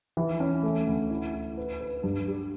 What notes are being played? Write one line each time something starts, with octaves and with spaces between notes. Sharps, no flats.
E3
C#4
A3
D2
E4
E4
B4
B4
G2
G3